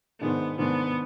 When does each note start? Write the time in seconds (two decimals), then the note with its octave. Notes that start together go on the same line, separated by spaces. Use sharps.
0.20 G#2 D#3 G#3 B3 D4
0.58 G#2 D#3 G#3 B3 D4